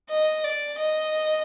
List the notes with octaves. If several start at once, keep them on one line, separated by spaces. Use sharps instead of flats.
D#5
D5
D#5